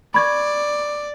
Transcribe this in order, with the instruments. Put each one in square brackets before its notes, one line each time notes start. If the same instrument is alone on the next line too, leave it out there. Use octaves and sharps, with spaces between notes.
[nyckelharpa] D5 [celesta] B5 C#6 G#6